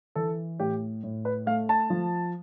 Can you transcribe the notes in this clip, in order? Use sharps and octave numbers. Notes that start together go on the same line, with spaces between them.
E3 A4
A2 G4
A2
B4
A3 F5
A5
F3